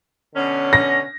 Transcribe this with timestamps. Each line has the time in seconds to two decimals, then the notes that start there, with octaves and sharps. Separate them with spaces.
0.35 B2 D3 C#4
0.73 A#6